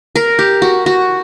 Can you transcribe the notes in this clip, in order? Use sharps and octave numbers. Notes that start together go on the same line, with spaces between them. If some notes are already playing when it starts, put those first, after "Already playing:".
A#4
G4
F#4
F#4